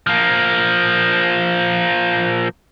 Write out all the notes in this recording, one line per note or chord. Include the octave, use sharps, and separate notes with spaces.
F3 A#3